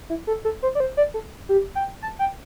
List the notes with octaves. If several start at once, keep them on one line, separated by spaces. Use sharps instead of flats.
E4
A4
A4
C5
D5
C5
D5
A4
G4
G5
A5
G5